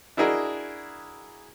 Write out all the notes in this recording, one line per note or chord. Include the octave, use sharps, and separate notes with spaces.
D4 E4 F#4 G#4 A#4 D#5